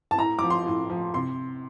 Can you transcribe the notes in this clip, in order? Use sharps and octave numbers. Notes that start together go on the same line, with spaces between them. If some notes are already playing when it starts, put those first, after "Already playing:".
A5
A2 A#5
F3 D6
C6
A2
F3
C3 C6